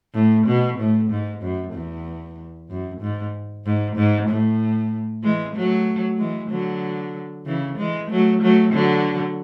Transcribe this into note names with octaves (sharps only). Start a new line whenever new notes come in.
A2
B2
A2
G#2
F#2
E2
F#2
G#2
G#2
G#2
A2
E3 G#3
F#3 A3
E3 G#3
D3 F#3
C#3 E3
E3 G#3
F#3 A3
F#3 A3
D3 F#3